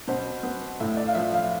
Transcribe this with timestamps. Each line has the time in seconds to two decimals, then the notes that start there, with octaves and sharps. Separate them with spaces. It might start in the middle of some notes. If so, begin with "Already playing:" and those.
0.08 B2 C5
0.43 B3
0.80 A2 E5
0.97 D5
1.07 F5
1.15 F3 E5
1.34 F5